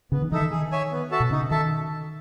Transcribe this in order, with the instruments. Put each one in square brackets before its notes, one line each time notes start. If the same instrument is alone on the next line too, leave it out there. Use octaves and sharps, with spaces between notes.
[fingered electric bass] C#3 [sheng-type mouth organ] B3
[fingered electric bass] D#3
[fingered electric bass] E3 [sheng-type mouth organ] D#4 A4 E5
[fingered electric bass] D#3
[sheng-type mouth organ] G#4
C#5 E5 G#5
B3
F#4 A4 E5 A5
[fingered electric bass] B2
[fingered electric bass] C#3 [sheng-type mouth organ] D#4
[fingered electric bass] D#3 [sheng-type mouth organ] A4 E5 A5